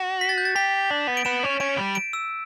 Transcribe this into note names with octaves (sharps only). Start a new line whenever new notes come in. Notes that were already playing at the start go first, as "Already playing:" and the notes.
Already playing: F#4
B6
A6
G6
A6
G4 B6
D4
B3
D7
B3 E7
C#4
C#4 D7
G3
D7
E6